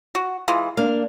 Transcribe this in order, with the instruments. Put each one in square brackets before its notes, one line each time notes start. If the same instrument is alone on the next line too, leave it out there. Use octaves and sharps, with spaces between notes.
[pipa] F#4
E3 G#3 F4
[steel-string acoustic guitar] A#3 D4 [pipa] F5